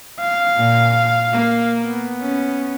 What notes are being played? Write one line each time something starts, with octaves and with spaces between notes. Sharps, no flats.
F5
A#2
A#3
B3
C#4